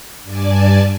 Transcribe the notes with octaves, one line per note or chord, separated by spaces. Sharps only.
G2 D5 G#5 A5